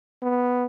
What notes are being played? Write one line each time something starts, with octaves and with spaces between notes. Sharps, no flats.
B3